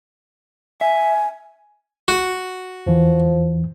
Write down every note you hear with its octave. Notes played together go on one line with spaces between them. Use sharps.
E5 G#5
F#4
E2 E3 F3